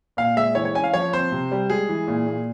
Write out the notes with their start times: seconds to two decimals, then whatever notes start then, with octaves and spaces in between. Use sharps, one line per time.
0.17 A#2 F5
0.37 G#3 E5
0.55 E3 C#5
0.65 C#5
0.75 C#4 G#5
0.84 F5
0.94 F3 C#5
1.13 C4 C5
1.32 C3
1.52 G3
1.70 G#3 G#4
1.89 E3
2.08 A#2
2.27 A#2